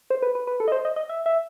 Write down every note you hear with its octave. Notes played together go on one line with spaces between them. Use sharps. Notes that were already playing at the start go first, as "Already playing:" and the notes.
C5
B4
B4
B4
A4
D#5
C5
D#5
D#5
E5
E5